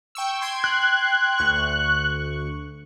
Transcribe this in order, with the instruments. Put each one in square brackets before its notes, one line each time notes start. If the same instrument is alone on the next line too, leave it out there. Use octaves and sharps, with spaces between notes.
[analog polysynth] G5 C#6 E6
G5 C6 G#6
[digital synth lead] F#6
[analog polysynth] D2 C#6